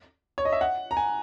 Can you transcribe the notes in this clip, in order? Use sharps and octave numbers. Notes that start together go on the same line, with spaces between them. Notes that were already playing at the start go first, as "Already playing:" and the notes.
C#5
D#5
E5
F#5
A#5
G#5